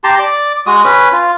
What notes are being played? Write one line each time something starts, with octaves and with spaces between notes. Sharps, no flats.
G4 A5 A#5 C6
D5 D6
G#3 F#4 D#6
C#4 B4
F4